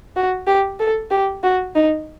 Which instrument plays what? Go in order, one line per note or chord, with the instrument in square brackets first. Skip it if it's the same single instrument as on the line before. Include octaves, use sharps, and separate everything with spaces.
[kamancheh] F#4
G4
A4
G4
F#4
D#4